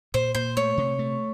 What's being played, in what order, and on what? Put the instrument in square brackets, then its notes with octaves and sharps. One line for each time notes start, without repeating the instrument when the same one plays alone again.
[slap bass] A#2 [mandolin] C5
[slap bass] A#2 [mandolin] C5
[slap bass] A3 [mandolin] C#5
[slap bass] C3
A3